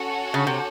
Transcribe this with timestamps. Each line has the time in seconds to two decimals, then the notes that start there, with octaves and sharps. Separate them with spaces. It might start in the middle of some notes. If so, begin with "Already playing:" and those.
Already playing: C#4 F#4 A4 C#5 F#5
0.34 C#3
0.47 C3